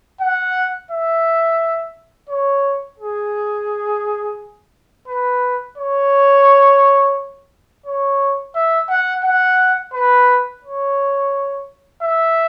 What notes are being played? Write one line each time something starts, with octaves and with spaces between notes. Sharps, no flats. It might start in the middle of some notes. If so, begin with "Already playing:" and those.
F#5
E5
C#5
G#4
B4
C#5
C#5
E5
F#5
F#5
B4
C#5
E5